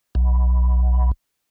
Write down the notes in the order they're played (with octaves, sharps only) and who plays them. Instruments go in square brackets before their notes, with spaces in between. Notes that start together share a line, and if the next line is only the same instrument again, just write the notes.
[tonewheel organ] B1